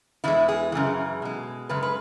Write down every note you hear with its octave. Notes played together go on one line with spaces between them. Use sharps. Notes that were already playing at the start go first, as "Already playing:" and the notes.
E2 E3 G#3 E4
G#4
F#2 C#3 E3
B2 G#3
F#2 C#3 G#3 B4
B4